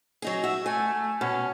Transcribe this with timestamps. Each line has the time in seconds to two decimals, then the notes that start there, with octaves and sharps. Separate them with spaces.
0.22 F#3 D#4 G#4
0.44 F#4 E5
0.66 A3 G#5
0.93 A3
1.21 B2 C#4